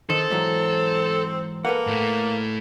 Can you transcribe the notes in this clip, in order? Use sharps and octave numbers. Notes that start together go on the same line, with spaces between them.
D#3 C4 A4
G#2 E3 F#3
A#3 A4 B4 F#5
A2 A3